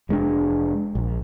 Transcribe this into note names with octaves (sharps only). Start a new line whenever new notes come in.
F1 G#3 C#4 D4
A#1